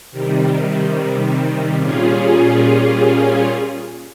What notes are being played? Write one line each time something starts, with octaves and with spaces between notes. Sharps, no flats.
C3 D#3 G3
A#2 G3 C#4 F4 G#4